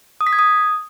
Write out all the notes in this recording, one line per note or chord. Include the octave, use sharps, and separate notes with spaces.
D#6
B6
G#6
D#6